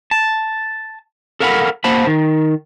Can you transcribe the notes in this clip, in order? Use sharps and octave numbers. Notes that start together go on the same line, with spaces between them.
A5
A4 A#4 F5 F#5 A#5 B5
A#3 C5 F#5 A5 B5
D#3